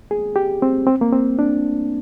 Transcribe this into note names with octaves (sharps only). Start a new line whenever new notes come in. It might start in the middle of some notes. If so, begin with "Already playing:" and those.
G#4
G4
C4
C4
A#3
C4
D4